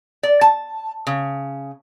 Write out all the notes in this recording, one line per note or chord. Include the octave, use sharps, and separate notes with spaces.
D5
A5
C#3